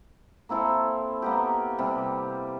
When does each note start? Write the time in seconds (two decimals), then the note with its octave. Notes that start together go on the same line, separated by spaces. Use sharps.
0.49 A#3 C4 E4 A4
1.22 A#3 B3 G4
1.79 C3 G3